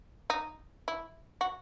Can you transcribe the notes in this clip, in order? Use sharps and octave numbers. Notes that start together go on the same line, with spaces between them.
D#4
E4
F#4